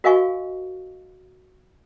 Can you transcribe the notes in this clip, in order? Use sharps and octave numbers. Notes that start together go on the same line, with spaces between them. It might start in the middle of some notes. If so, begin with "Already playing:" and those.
F#4 A#4 D#5 F5 G#5 C#6